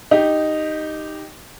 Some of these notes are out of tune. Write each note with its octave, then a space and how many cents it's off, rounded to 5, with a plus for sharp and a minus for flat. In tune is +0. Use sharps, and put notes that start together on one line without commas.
D#4 -5 G4 +0